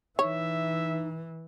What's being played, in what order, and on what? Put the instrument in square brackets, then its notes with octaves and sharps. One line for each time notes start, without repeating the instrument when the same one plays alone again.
[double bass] E3 [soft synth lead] D#4 [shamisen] C#5 [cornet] E5